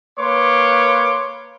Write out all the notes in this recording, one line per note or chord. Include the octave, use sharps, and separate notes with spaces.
A#3 B4 C#5 C6 D6